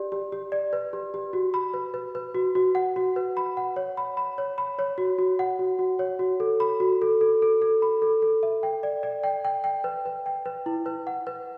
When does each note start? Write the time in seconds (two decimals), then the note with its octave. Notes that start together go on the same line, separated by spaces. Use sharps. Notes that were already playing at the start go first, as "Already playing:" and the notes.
Already playing: G4 D5
0.12 G4
0.32 G4
0.52 D5
0.73 B4
0.93 G4
1.14 G4
1.33 F#4
1.54 B5
1.74 B4
1.94 B4
2.15 B4
2.35 F#4
2.55 F#4
2.75 F#5
2.96 F#4
3.16 B4
3.37 B5
3.57 F#5
3.76 C#5
3.97 B5
4.17 B5
4.38 C#5
4.58 B5
4.79 C#5
4.98 F#4
5.19 F#4
5.39 F#5
5.59 F#4
5.79 F#4
5.99 C#5
6.19 F#4
6.40 A4
6.60 B5
6.80 F#4
7.02 A4
7.21 A4
7.42 A4
7.62 A4
7.82 B5
8.02 A4
8.22 A4
8.43 E5
8.63 G5
8.83 D5
9.03 D5
9.24 G5
9.45 G5
9.64 G5
9.84 B4
10.06 B4
10.26 G5
10.46 B4
10.66 E4
10.86 B4
11.07 F#5
11.27 B4